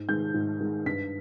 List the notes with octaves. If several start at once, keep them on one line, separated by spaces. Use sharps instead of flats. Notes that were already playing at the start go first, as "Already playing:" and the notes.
Already playing: G#2
D#3 G#3 G6
G#2
D#3 G#3
G2 B6